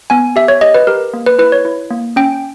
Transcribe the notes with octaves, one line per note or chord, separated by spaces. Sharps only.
B3 G#5
G4 E5
C#5
G4 D#5
B4
G4 A#4
A#3
B4
E4 B4
C#5
E4
A#3
C#4 G5